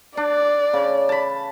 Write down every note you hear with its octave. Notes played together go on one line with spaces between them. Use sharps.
D4 D5
C#3
A5 B5